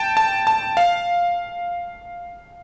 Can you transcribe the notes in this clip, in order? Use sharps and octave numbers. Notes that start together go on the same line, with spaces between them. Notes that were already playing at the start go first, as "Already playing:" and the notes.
Already playing: G5 A5
A5
A5
F5